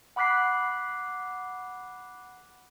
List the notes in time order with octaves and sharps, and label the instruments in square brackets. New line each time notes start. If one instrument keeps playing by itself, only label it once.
[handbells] F#5 B5 D6 F#6 B6 C7